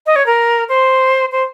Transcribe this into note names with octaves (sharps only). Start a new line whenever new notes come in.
D#5
C#5
A#4
C5
C5